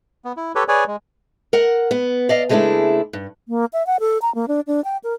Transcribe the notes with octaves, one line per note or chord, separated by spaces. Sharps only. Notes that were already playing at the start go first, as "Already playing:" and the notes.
B3
E4
G4 A4 B4 C#5
G#4 B4 C#5 D5 G#5
G#3
A#4 F#5
B3
D5 D#5 F5
C#3 G#3 A3 C#4 D4 E4
G2
A#3
E5
F#5
A4
A#5
A#3
D4
D4
G5
A#4